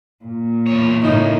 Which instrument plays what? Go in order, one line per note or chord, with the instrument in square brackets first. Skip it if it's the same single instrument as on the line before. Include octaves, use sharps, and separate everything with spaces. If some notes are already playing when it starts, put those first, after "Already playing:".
[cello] A#2
[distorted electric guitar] E2 C#5
[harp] A2 G#3 [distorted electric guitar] C#3 A#3 [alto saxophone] D#4